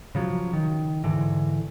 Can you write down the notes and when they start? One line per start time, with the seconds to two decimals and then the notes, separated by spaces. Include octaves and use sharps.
0.15 C#3 F3 F#3
0.53 D#3
1.04 G#2 D3 E3